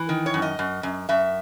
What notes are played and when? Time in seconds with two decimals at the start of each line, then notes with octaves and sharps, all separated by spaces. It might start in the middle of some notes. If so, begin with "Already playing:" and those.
Already playing: E3
0.09 D#3
0.26 C#5
0.34 F#2
0.42 D#5
0.59 F#2
0.83 F#2
1.09 F#2 E5